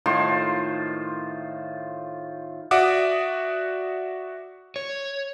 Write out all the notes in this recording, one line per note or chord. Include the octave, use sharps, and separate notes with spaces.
A2 D#3 F4 C5
F#4 D5 E5 F#5 D6 D#6
C#5